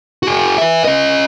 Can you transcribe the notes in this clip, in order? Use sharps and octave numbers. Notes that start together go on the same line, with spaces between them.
F#4 G#4
B4 E5
C#4 D#5